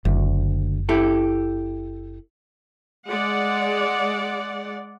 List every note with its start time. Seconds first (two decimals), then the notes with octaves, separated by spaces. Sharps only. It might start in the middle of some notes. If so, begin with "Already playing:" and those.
0.05 F#1 D2
0.89 E4 G4 A4
3.08 G#3 D5 F#5